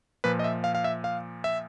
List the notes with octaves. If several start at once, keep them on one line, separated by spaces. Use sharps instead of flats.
A#2 F3 B4
D#5
E5
F5
F5
E5
F5
E5